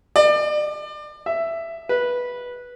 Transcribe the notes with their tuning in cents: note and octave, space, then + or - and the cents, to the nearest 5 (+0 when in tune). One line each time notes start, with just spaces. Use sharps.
D5 +35
E5 +10
B4 -10